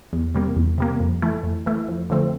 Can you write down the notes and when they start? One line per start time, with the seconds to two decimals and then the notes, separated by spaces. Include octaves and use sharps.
0.13 E2
0.34 C3 G3 A#3
0.56 E2
0.78 C3 G3 A#3
1.00 F2
1.22 E3 A3 E4
1.43 F2
1.66 E3 A3 E4
1.88 F2
2.10 D3 F3 A3 C4